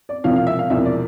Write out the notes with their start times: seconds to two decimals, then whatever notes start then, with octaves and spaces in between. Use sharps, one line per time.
0.09 D5
0.24 E1 E2 C3 F3 F5
0.36 F5
0.47 E5
0.59 F5
0.70 E1 E2 C3 F3 E5
0.85 D5